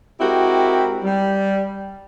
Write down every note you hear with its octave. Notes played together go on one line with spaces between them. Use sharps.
G#3 C4 E4 F#4 G4 A#4
G3